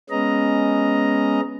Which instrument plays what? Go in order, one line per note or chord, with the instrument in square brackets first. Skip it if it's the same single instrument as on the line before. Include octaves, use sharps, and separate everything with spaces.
[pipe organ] G#3 B3 C#4 D#5 A#5